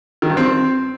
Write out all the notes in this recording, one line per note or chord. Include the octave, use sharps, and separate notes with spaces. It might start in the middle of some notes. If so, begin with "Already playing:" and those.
D#3
G2
C4